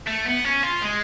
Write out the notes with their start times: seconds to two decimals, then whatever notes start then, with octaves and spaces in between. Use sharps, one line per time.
0.07 A3
0.25 B3
0.44 C#4
0.63 F4
0.82 G#3